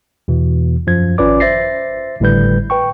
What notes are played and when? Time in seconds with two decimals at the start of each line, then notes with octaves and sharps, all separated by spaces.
0.28 E2 B2 E3
0.87 F#2 F3 G#6
1.18 G#1 C#4 F4 B4 D5 D6
1.40 C5 E5 A6 A#6 C7
2.20 G#1 A2 D3 G3 B4 G6
2.70 B4 G5 C#6